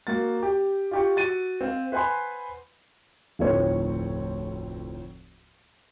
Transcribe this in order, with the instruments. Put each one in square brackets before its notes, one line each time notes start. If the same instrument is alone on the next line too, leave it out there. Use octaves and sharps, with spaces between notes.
[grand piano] A#3 F#4 A6
G4
F4 G4 C#6
F#4 A6 D#7
C4 F5
B4 C5 F#5 G#5 B5 C6
F1 D2 A2 F3 C4 C#5